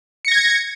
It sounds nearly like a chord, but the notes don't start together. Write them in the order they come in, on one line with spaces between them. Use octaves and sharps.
C#7 A#6 G#6